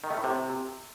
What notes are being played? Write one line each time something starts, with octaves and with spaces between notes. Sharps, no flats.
D#3
A3
A2
C3